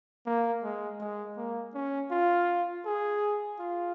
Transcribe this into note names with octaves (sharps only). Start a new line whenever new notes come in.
A#3
G#3
G#3
A#3
C#4
F4
G#4
F4